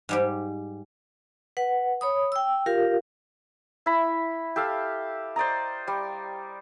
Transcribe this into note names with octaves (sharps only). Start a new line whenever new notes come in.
G#2 G3 G4
B4 F#5
C#5 B5 D#6
G5 E6
F4 G4 A#4 F5
E4 B5
G4 A4 E5 F5
C5 D5 D#5 A#5
G3